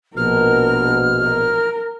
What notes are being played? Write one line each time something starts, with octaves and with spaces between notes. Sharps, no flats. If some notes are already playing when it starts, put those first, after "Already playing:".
A#1 B2 A#4 F6
A#4